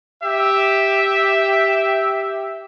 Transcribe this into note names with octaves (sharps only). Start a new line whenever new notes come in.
G4 E5